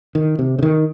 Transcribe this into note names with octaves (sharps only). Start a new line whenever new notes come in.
D#3
C3
C#3
D#3